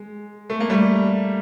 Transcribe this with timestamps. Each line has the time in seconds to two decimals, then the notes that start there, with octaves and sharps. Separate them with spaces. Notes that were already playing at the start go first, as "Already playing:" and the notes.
Already playing: G#3
0.50 A3
0.60 A#3
0.70 G3 A3